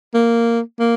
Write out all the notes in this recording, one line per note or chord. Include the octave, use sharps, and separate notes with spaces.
A#3
A#3